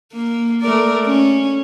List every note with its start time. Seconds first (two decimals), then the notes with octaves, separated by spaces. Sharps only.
0.13 A#3
0.61 A3 A#4 D5
1.06 C#4